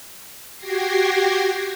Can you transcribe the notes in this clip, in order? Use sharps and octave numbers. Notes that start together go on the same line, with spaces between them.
F#4 G4 G5 G#6 A#6 C7